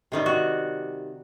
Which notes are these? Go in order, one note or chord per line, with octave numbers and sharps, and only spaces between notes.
C3 D#3 G3
F#4